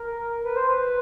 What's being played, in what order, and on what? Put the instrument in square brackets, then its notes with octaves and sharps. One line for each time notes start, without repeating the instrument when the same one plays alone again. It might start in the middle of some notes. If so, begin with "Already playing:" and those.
Already playing: [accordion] A#4
B4
C5
B4